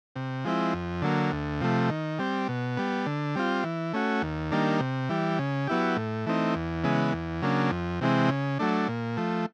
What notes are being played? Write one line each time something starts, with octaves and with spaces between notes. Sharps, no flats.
C3
F3 G#3 C4 E4
F2
D3 F#3 A#3
D2
C3 F3 A3
D#3
G3 C4
B2
G3 B3
D3
G3 C4 F4
E3
A3 C#4 F#4
D#2
D#3 G3 A#3 D4
C3
E3 G3
C#3
F#3 B3 E4 G4
A2
E3 A3 C4 D#4
E2
C#3 E3 G#3 B3
E2
C#3 F#3 A#3 D4
F2
C3 E3 G#3 C4
C#3
F#3 A3 D4
A#2
F3 A3